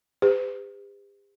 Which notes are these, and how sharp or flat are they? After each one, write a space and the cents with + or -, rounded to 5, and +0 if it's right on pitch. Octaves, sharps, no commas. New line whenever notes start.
G4 +45 B4 +45